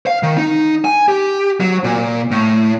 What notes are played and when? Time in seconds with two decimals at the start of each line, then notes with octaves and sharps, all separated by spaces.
0.07 F5
0.23 D#3
0.38 D#4
0.85 G#5
1.08 G4
1.60 F#3
1.84 A#2
2.31 A2